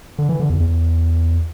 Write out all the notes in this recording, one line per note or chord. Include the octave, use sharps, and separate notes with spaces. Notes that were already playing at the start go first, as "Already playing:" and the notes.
D3
E3
D3
E2
E2